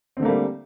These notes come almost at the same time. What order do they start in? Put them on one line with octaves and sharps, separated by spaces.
C4 D3 A3 A#3 G3